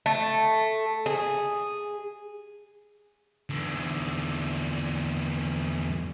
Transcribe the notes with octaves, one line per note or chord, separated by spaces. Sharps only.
A3
G#4
E2 D3